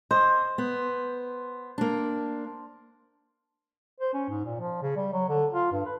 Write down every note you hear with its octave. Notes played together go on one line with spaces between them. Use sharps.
C5 D#5
B3
A#3 D4
C5
C#4
G#2
A#2
F3
C#3
G3
F#3
D3
F4
G2
B4